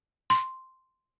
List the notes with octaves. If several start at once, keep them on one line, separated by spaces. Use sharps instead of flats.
C6